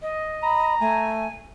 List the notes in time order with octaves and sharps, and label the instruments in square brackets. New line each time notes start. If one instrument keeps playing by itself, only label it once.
[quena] D#5
[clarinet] A#5 [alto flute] B5
[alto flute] A3 [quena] G#5